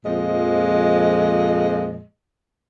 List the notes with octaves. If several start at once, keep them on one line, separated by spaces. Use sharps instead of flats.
F2 A#2 F3 G#3 D#5